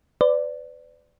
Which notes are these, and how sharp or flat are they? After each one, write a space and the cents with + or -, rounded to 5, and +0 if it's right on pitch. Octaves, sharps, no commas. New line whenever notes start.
B4 +35 D5 +0